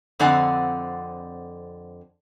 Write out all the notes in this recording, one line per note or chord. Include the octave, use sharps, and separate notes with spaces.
F2 D3 C4 D5 F#5 G#5